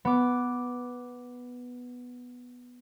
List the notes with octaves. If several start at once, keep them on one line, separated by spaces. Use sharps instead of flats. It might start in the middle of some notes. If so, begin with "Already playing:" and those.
B3 D6